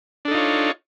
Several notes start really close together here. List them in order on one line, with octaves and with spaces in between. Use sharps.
D4 A4 D#4 F4 C#5